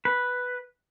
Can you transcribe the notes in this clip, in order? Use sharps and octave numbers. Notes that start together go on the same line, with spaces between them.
B4